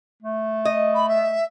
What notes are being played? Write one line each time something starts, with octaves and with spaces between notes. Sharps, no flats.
A3
D#5
B5
E5